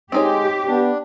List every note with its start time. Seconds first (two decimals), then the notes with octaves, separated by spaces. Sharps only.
0.12 G#3 C4 D#4 G4 C#5
0.68 B3 D4